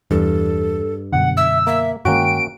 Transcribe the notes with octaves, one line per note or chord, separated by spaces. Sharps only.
E2 G2 E3 A4
F#2 B2 D3 F#5
E5 E6
A#3 E5
G2 D#3 G#3 A#3 C#4 F#4 G5 D7